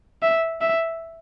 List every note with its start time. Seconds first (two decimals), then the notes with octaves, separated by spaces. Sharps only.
0.23 E5
0.61 E5